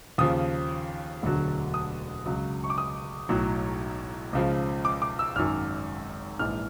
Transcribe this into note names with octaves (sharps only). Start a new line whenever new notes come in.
D#2 C#3 F3 D#6
E1 D2 D3 F#3
D#6
C#2 C#3 F#3
C#6
D6
D#6
B1 A2 F#3
C#2 C#3 F3
D6
D6
E6
G#1 F#2 D#3 F6
A#1 G#2 E3 F6